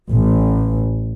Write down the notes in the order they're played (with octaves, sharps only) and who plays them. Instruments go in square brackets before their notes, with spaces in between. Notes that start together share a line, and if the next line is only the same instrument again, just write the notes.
[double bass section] A1